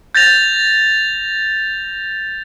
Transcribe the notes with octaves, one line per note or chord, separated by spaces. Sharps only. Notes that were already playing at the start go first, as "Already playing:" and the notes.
G6 A6 A#6 F7